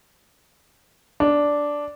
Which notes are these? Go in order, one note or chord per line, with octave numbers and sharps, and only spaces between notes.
D4